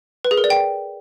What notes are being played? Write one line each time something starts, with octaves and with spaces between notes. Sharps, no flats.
B4
G#4
A#4
D5
G5